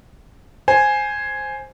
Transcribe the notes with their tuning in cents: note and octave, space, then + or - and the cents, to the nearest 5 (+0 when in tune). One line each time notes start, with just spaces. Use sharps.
C5 +5 G#5 +0